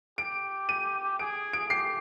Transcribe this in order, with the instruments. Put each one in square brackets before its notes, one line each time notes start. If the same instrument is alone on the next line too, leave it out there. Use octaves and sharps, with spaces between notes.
[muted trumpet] G4 [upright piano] D7
[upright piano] D#7
[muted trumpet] G#4 [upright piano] D7
[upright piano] D7
[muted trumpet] G4 [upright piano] C7